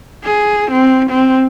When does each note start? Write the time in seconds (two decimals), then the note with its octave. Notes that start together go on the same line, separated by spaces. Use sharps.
0.24 G#4
0.71 C4
1.11 C4